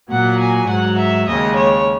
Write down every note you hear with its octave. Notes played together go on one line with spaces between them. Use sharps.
A#2 F#3 F#5
G#5
G#2 F#3 F#5
E5
D#2 C#3 G#3 D#5
C#5